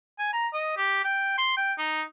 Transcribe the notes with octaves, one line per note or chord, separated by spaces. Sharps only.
G#5
A#5
D#5
G4
G5
C6
G5
D#4